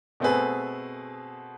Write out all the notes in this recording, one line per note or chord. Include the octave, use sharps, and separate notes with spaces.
B2 A3 C4 G#4 B4